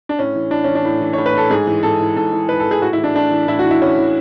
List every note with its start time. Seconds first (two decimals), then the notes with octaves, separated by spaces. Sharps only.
0.09 D4
0.19 A2 C#4
0.36 E3
0.51 A2 D4
0.64 E3 C#4
0.75 D4
0.85 A2
1.01 E3
1.13 A2 C#5
1.26 B4
1.34 E3 A4
1.50 G#2 G#4
1.67 E3
1.83 G#2 A4
2.00 E3
2.16 G#2 A4
2.33 E3
2.49 G#2 B4
2.60 A4
2.66 E3
2.71 G#4
2.82 A2 F#4
2.93 E4
2.98 E3
3.04 D4
3.15 A2 D4
3.31 E3
3.48 A2 E4
3.59 F#4
3.64 E3
3.71 E4
3.81 A2 C#4
3.98 E3